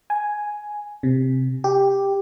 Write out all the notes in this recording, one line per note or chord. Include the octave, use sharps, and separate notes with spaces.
G#5
C3
G4